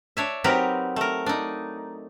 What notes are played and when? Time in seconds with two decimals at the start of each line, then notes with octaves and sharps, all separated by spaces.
0.17 D4 C#5 E5
0.44 F#3 C4 D#4 G4 A#4 B4
0.96 A3 A#4
1.26 D4 D#4